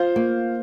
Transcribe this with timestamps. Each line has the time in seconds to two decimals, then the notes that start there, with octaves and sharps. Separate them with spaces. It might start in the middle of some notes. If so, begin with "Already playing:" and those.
Already playing: F4 C5 F5
0.16 A#3